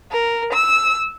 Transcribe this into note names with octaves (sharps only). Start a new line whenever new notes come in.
A#4
E6